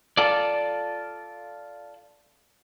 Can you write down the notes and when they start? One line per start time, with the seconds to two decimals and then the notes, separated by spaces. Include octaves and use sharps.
0.17 F4 A4 D5